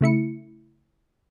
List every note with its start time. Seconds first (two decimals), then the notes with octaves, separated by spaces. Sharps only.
0.01 C#3 A3 E4 C#7